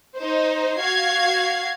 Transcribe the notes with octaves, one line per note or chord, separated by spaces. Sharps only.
D#4 C5
F#4 F5 G#6 C7